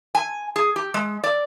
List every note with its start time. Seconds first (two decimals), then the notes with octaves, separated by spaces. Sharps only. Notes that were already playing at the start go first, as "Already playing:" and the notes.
0.15 G#5
0.56 G#4
0.76 G4
0.94 G#3
1.24 D5